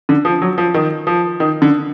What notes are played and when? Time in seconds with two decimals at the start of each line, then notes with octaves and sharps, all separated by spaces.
0.09 D3
0.25 F3
0.42 F#3
0.58 F3
0.74 D#3
1.07 F3
1.40 D#3
1.62 D3